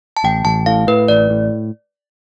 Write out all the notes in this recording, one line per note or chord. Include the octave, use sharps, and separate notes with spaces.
A5
A1 G5
A1 A5
A2 F5
A2 B4
A1 D5
A2